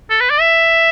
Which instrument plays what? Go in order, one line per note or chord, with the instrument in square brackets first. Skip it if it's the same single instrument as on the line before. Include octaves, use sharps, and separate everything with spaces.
[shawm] A4
B4
D5
E5